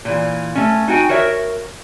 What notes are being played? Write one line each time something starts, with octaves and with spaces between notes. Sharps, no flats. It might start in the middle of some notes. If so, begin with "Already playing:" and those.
A#2 E3
A3 C#4
D#4 F#4 G5 G#5
F#4 A#4 C#5 E5